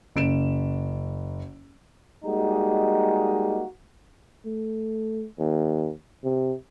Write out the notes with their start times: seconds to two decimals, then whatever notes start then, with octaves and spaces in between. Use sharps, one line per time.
0.16 F#1 D7 E7
2.24 G3 G#3 A#3 D#4 F#4
4.45 A3
5.38 D#2
6.24 C3